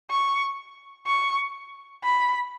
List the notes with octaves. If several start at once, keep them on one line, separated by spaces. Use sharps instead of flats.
C#6
C#6
B5